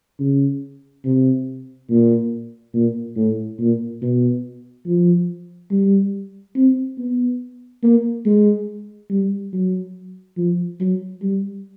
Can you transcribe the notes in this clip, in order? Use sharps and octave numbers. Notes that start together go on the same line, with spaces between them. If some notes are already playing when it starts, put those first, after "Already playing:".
C#3
C3
A#2
A#2
A2
A#2
B2
F3
G3
C4
B3
A#3
G#3
G3
F#3
F3
F#3
G3